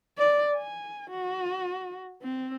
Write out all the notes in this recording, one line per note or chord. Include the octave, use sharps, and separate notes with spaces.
D5
G#5
F#4
C4